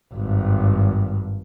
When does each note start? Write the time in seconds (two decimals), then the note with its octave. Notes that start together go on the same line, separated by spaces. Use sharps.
0.13 G#1 G2